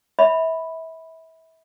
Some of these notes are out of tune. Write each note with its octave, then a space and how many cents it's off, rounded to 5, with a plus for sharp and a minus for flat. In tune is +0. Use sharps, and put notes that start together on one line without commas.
E5 -30 B5 +0